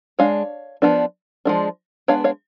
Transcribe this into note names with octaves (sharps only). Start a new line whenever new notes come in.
G#3 D4 C#5 F5
F3 B3 D4
F3 G#3 D4
G#3 B3 D4 C#5 F5
C#5 F5